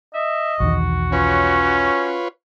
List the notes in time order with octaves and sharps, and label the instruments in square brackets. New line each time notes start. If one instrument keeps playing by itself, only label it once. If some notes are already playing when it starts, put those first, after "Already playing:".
[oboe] D#5 [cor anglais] E5
[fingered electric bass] B1 E2 D#3 [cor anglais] F#4
[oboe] C#4 [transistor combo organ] F4 B4 C#5